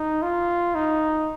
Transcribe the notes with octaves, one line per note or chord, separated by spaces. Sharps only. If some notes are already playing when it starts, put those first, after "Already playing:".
Already playing: D#4
F4
D#4